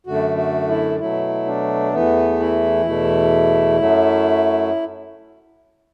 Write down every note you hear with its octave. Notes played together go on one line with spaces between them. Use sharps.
F#2 D3 A3 F#4
F#4
E4
B2 F#3 A3 E4
D4
E2 E3 A3 B3
E4
E2 B2 A3
F#2 F#3 A3